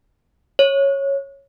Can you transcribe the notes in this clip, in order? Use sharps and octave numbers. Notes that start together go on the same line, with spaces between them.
C#5